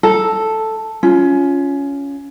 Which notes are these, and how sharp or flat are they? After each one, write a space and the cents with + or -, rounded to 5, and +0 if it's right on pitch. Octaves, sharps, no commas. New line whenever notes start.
A4 +0 A#5 +0
C#4 +15 F4 +0